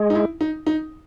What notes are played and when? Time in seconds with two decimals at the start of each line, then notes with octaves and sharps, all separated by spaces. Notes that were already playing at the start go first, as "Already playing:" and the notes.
Already playing: G#3
0.10 D#4
0.15 E4
0.41 D#4
0.67 D#4